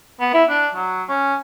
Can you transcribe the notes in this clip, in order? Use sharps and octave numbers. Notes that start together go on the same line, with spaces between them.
B3
E4
D4
F#3
C#4